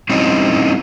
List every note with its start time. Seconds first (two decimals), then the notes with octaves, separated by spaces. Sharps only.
0.10 G3 C4 C#4 D#4 E4 F#4